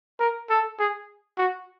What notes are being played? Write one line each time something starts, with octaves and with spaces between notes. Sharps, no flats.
A#4
A4
G#4
F#4